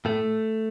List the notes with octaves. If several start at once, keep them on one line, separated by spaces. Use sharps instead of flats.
A2 A3